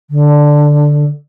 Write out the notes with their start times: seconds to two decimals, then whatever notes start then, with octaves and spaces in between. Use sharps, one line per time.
0.10 D3